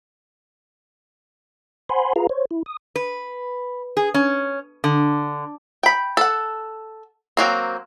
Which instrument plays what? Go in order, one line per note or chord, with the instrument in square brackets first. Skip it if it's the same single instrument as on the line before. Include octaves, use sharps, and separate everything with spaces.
[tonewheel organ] C5 F#5 G#5 B5 C6
F4 G#4 B4 F5 A#5
C5 C#5
E4
D#6
[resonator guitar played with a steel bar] B4
G#4
C#4
D3
[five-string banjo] G5 B5
A4 F#5
F#3 A#3 C4